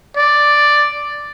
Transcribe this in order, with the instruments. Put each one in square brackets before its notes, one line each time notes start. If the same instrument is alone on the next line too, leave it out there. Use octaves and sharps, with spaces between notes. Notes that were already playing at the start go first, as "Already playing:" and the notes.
[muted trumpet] D5